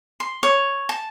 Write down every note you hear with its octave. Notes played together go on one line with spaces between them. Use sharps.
C6
C#5
A5